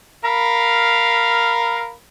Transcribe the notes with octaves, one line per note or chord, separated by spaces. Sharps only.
A#4 F5 B5